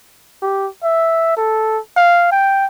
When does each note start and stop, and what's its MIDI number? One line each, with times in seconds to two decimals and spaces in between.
0.42 0.68 67
0.83 1.34 76
1.37 1.79 69
1.97 2.27 77
2.32 2.66 79